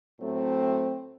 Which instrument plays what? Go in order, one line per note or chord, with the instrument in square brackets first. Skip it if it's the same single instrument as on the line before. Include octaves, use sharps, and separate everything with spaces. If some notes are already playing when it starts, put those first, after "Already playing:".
[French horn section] A2 F#3 A3 C4